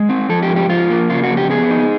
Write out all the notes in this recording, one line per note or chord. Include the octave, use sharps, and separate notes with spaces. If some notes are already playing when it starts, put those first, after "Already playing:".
Already playing: G#3
C4
F3 A4
G4
G#2
G4
F3 F4
A#3
C#3 F4
F#4
F2
G4
B3 G#4
D#4